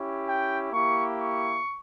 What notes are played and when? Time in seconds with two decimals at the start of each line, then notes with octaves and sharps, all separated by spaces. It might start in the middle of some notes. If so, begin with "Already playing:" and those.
Already playing: C#4 E4 G4
0.29 G5
0.73 A#3 E4 G4 C#6
1.19 C#6